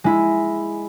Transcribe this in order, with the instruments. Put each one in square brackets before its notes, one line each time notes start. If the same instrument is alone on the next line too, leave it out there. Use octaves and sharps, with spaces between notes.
[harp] G#3 E4